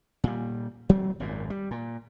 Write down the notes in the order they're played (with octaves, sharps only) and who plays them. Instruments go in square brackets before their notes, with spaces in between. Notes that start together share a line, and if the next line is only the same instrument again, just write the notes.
[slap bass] A#2 G3
F#3 G3 A3 C4
G#1 F#2 A#2
G3
A#2